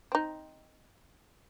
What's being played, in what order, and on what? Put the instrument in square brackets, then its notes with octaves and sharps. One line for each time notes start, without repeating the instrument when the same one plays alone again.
[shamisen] C4 D#4